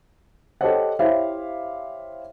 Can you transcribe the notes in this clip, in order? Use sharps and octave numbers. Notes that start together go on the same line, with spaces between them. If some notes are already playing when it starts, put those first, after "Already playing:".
G4 A4 C5 C#5 D#5 F#5
E4 G4 C5 C#5 E5 F5